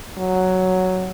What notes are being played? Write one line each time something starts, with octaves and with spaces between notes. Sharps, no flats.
F#3